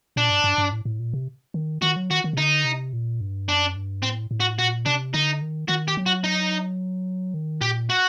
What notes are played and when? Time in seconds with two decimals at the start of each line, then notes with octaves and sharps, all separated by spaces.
0.16 A#2 D4
0.30 G2
0.44 G2
0.58 G2
0.72 A2
0.85 A2
1.00 A#2
1.13 C3
1.54 D#3
1.82 D#3 F#4
1.96 F#3
2.10 D#3 F#4
2.24 D#3
2.33 C3
2.38 D3 D#4
2.65 C3
2.93 A#2
3.21 G2
3.48 F#2 D4
3.76 G2
4.03 A2 C4
4.31 A2
4.40 F#4
4.59 A#2 F#4
4.86 C3 D4
5.14 D3 D#4
5.42 D#3
5.68 D#3 F#4
5.88 G4
5.97 F#3
6.06 F#4
6.24 D#4
7.34 D#3
7.61 A#2 G4
7.90 F#4